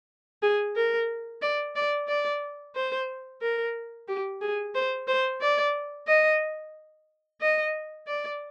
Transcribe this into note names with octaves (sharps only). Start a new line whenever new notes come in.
G#4
A#4
D5
D5
D5
C5
A#4
G4
G#4
C5
C5
D5
D#5
D#5
D5